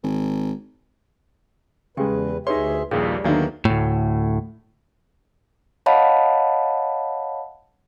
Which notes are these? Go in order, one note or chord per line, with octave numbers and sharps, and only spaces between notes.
G#1
E2 C#3 G#3 G4 B4 G5
D2 D#4 G4 G#4 B4 C#5 E5 C6
A#1 D#2 A#2 G3 A#3 G#4 C#5 G5
D#2 D3 D#3 F#3 A#3 B3 D4 E5
D2 A2
C#5 D#5 F5 F#5 A5 B5